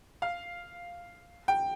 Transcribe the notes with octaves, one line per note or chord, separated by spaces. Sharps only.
F5
G5